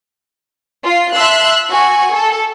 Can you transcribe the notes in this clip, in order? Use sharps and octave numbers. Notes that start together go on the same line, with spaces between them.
F4 C7
E5 A5 C6 E6 F#6
F#4 G#5 C#6
A4